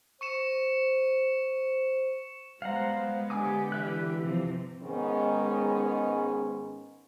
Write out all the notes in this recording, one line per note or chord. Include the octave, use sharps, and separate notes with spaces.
C5 C#6 C#7 E7
G3 G#3 B3 C5 F5 F#5 A#5
D3 G4 G#5 D6 D#6
E3 E5 F#6
C3 F3 C4
G#2 D#3 G#3 B3 C#4